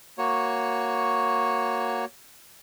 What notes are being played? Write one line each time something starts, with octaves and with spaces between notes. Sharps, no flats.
A#3 F#4 C#5